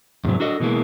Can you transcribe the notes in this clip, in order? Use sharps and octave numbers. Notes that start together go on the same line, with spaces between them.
E2 G#2 C3 F#3
D4 F#4 A4 D#5
B2 E3 G#3 A#3